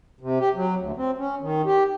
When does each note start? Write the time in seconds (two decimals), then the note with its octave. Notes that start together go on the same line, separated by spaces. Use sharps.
0.20 C3
0.40 G4
0.55 F#3
0.80 D2
0.97 C4
1.18 C#4
1.42 D#3
1.65 G4